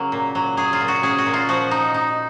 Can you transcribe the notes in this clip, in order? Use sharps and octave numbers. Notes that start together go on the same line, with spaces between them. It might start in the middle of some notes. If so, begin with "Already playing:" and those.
Already playing: C#3 F#3 A#3
A#2
F#3
F#3 G#4
F4
A#2
F#4
C#4 G#4
F#4
A#2
F4
F3 F#4
D#4
D#4